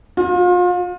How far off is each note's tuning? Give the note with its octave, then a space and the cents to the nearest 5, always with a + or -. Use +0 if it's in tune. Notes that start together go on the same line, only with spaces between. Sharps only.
F4 +35